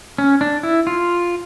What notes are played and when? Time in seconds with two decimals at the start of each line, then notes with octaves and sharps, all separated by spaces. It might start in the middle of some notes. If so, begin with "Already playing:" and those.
0.18 C#4
0.41 D4
0.63 E4
0.87 F4